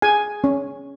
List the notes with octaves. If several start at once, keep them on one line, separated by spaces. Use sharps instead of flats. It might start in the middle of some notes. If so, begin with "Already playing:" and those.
G#4 G#5
C#4